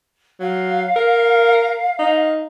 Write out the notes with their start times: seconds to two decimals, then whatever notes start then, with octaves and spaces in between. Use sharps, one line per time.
0.40 F#3 F5
0.96 A#4
1.99 D#4